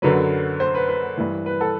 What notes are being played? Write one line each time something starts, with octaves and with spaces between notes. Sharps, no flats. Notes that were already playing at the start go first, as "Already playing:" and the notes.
F#2 D3 F#3 B4
C5
B4
B4
G2 E3
B4
A4